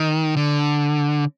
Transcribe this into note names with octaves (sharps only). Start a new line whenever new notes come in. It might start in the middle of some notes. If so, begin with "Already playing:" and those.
Already playing: D#3
D3